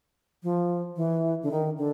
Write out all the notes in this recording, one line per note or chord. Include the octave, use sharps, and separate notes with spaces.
F3
E3
D3
D#3
D3